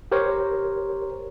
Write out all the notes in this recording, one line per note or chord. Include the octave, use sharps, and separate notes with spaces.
G4 A#4 C5 C#5